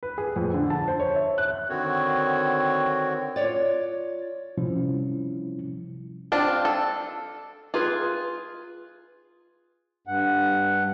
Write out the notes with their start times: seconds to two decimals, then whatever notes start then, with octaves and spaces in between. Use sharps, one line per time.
0.03 B4
0.18 G#4
0.36 F2
0.54 D3
0.70 A5
0.88 C5
1.00 C#5
1.15 E5
1.38 F#6
1.69 D3 D#3 C4 F#4 C#5
3.36 F4 C#5 D5
4.58 C3 F3 G3 C#4 E4
6.32 C4 D4 F4
6.65 A4
7.74 F4 G#4 B4
10.07 G2 F#5